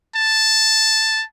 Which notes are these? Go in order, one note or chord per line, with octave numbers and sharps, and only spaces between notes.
A5